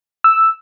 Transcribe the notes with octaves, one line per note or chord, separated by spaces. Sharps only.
E6